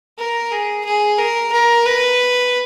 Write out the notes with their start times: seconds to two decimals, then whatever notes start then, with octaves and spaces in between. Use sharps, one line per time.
0.19 A#4
0.52 G#4
0.85 G#4
1.19 A#4
1.52 A#4
1.86 B4